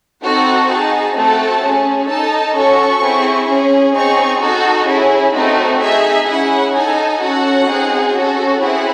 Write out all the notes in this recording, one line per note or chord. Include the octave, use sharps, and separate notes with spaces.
C4 D#4 F#4 A4 F#5
D#4 G#4 A5
A3 C4 F#4 A4 A5
C#4 G#4
D#4 A4 A5
C#4 F#4 A4 C#6
C4 E4 G#4
C#4 G#4
C4 D#4 G#4 C#6
D#4 F#4 A4
C#4 E4 G#4
A3 C4 D#4 F#4
D#4 G#4 E5
C#4 E4 G#4 F#5
D#4 A4 G#5
C#4 F#4 A4 F#5
C4 D#4 G#4
C#4 F#4 A4
C4 E4 G#4 F#5